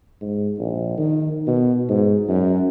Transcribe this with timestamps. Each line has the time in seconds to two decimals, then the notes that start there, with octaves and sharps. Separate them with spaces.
0.21 G#2
0.59 A#1
0.98 D#3
1.47 B2
1.89 G#2
2.28 F#2